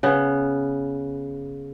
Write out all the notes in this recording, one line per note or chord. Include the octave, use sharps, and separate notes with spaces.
C#3 B3